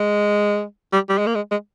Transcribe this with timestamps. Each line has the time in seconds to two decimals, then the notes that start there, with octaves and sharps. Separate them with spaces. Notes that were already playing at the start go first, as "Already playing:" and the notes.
Already playing: G#3
0.93 G3
1.09 G3
1.18 G#3
1.26 A#3
1.35 G#3
1.51 G#3